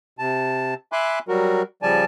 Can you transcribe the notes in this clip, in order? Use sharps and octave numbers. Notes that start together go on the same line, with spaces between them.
C3 A5
E5 G#5 B5 C6 D6 F#6
F#3 G3 F#4 A#4
C#3 F3 G3 D5 G#5 A5